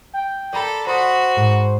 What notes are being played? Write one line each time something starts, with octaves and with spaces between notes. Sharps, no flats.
G5
A4 D5 A#5 B5
F#4 C5 B5 C6 D#6
G#2